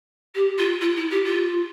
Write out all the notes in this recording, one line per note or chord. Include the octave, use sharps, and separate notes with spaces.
G4
F4
F4
E4
G4
F4